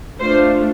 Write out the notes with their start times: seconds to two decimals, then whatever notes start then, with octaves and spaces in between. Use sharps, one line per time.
0.19 A3 D4 F4 C5